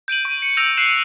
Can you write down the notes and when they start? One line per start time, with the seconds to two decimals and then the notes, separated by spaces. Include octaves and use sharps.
0.08 G6 D7 D#7 F#7
0.25 C#6
0.42 C#7
0.57 E6 G6 A#6 D7 F7 F#7
0.77 F#6 C7 C#7 D#7 E7 F#7